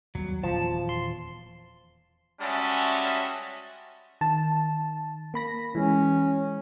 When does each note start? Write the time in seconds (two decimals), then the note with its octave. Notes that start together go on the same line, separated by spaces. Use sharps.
0.15 D#2 F#3 G3 B3
0.43 D#1 E2 F3 A5
0.89 C6
2.41 G3 G#3 C#4 F#4 E5 A5
4.21 D#3 A5
5.34 A#3 B5 A#6
5.75 E3 G#3 C#4